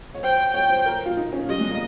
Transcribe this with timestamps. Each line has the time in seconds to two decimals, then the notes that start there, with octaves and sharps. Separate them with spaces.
0.15 C#5
0.23 C5 G5
0.54 C#5 G5
0.70 C5
0.86 A#4
1.06 F4
1.17 D#4
1.33 C#4
1.49 G3 D#5
1.60 G#3
1.70 A#3